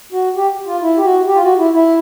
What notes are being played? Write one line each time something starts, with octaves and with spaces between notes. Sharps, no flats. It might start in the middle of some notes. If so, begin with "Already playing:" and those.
F#4
G4
F4
E4
G4
F#4
G4
F4
F#4
E4
E4